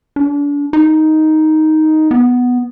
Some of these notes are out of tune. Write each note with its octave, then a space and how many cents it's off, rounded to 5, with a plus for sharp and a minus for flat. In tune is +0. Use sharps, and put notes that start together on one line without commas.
D4 -35
D#4 +5
B3 +0